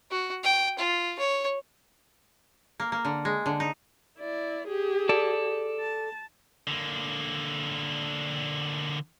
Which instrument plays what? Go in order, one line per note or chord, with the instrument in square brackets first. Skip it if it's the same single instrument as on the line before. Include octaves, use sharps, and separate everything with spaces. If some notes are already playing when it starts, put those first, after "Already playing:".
[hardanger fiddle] F#4
G5
F4
C#5
[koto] A#3
A#3
D3
G#3
D3
D#4
[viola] E4 D5
G4 G#4
[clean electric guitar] A4 D5
[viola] A5
[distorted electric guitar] D3 A#3